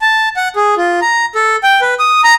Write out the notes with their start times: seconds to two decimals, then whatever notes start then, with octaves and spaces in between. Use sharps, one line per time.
0.02 A5
0.36 F#5
0.56 G#4
0.77 F4
1.02 A#5
1.35 A4
1.63 G5
1.81 B4
1.99 D#6
2.24 A#5